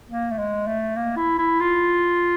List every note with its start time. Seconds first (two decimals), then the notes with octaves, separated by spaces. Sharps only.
0.10 A#3
0.31 A3
0.39 G#3
0.67 A3
0.96 A#3
1.16 E4
1.38 E4
1.60 F4